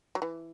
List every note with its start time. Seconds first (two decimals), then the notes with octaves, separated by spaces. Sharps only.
0.15 F#3
0.22 E3